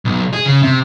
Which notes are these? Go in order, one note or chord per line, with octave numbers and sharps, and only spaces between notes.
B1
G#4
C#3
C3